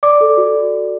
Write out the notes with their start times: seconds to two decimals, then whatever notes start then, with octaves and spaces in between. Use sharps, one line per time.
0.03 D5 D6
0.21 A4
0.37 F#4